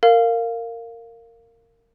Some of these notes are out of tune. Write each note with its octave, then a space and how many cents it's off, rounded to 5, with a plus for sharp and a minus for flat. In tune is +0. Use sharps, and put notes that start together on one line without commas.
A#4 -20 F5 +0